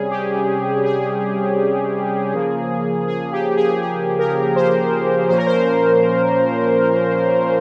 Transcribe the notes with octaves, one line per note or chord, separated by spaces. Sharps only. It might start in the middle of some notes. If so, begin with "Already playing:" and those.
Already playing: C3 G3 C#4 G#4
G4
G#4
C#3 F3 A#3
G#4
G4
G#4
G#4
A#4
C5
A#2 F3 A#3 C#4 C5
A#4
C5